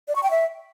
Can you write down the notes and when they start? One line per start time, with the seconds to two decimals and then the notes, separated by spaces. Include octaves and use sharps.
0.08 D5
0.16 C#6
0.23 G5
0.31 E5